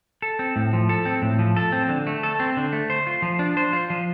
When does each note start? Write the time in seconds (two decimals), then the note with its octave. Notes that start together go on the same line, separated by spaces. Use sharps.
0.22 A4
0.39 C4
0.56 A2
0.73 F3
0.89 A4
1.05 C4
1.22 A2
1.39 F3
1.56 A4
1.72 C4
1.89 D3
2.07 A3
2.23 A4
2.40 C4
2.57 D3
2.73 A3
2.90 C5
3.07 F4
3.22 F3
3.39 D4
3.57 C5
3.73 F4
3.90 F3